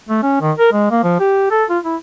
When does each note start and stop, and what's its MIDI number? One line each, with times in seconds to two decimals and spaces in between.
0.09 0.22 57
0.23 0.41 61
0.41 0.52 51
0.58 0.70 70
0.72 0.86 56
0.91 1.00 58
1.03 1.18 53
1.20 1.50 67
1.51 1.64 69
1.70 1.79 65
1.85 1.96 64